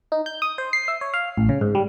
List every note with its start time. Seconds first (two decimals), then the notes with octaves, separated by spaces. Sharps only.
0.12 D#4
0.26 G6
0.42 D#6
0.58 C5
0.73 C7
0.88 E5
1.01 C#5
1.14 F5
1.38 A1
1.49 C#3
1.61 G#2
1.75 G3